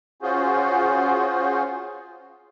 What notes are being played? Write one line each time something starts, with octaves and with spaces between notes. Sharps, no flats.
C#4 F4 F#4 G#4 C5